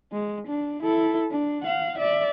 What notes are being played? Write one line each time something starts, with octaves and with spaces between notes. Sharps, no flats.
G#3
D4
E4 A4
D4
F5 F#5
D5 E5